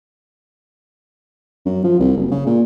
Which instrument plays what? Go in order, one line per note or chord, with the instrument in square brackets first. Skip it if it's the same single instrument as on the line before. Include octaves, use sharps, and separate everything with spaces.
[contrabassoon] F#2
F3
C2
F#1
C#3
A#2